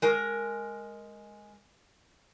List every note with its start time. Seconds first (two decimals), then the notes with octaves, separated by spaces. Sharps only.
0.02 G#3 A#4